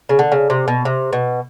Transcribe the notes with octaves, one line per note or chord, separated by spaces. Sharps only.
C#3
D3
C#3
C3
B2
C3
B2